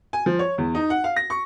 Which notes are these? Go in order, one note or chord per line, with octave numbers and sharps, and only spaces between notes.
G#5
F3
C#5
E2
D#4
F#5
F5
A#6
C#6